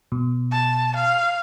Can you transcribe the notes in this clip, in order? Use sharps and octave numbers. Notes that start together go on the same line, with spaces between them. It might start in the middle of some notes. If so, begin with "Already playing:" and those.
B2
A5
F5